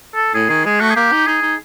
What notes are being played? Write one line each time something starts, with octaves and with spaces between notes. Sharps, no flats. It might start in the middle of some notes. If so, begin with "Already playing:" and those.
A4
A2 G#4
D#3 G#4
G#3 G#4
A3 F#4
G#4
A#3 G4
D#4
D#4 G#4
D#4